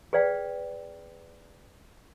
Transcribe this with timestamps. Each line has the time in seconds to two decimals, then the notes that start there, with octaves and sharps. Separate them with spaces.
0.13 G#4 B4 D5 F5 G5